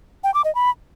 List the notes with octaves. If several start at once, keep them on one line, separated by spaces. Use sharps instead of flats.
G5
D6
D#5
B5